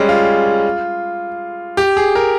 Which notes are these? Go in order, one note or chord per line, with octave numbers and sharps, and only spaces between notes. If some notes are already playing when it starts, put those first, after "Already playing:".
Already playing: G3 G#3 C#4
F4
G4
G#4
A#4